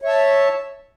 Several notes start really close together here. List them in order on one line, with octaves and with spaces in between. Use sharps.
C#5 E5 A5